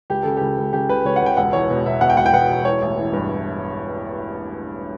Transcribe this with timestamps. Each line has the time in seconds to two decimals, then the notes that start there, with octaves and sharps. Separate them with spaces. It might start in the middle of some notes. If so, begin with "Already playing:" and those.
0.10 C#2 G4
0.23 C#3 A4
0.37 C#2 G4
0.58 C#2
0.73 C#3 G4
0.89 C#2 B4
1.05 C#2 C#5
1.16 F#5
1.22 C#2 G5
1.37 E1 F#5
1.53 E2 C#5
1.70 B2
1.86 B2 E5
2.01 B2 F#5
2.10 G5
2.17 E1 F#5
2.26 G5
2.33 B2 F#5
2.50 E1
2.65 E3 C#5
2.82 A1
2.97 E3
3.13 G2